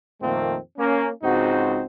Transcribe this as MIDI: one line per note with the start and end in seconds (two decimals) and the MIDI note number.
0.22 0.57 41
0.22 0.57 46
0.22 0.57 51
0.22 0.57 57
0.22 0.57 58
0.22 0.57 60
0.78 1.09 58
0.78 1.09 61
1.23 1.82 37
1.23 1.82 44
1.23 1.82 60
1.23 1.82 63
1.23 1.82 66